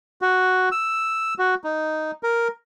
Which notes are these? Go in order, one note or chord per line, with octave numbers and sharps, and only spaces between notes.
F#4
E6
F#4
D#4
A#4